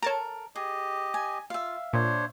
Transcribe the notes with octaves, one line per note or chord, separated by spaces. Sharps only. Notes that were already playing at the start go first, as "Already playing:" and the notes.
A4 A#4 C#5 A5 A#5
G4 G#4 D#5
G#5
F4 E5 F5
A#2 D4 C5 C#5